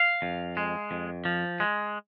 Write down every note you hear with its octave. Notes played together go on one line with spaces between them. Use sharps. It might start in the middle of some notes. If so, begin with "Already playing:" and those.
Already playing: F5
F2
G#3
F2
F3
G#3